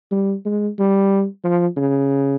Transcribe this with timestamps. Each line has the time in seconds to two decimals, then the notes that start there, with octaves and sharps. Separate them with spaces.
0.11 G3
0.45 G#3
0.78 G3
1.44 F3
1.77 C#3